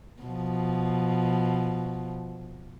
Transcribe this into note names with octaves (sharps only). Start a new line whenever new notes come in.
B2 F3